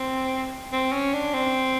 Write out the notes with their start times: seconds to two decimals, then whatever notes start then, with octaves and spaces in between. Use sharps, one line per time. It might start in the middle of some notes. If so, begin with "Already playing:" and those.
Already playing: C4
0.72 C4
0.93 C#4
1.14 D4
1.34 C4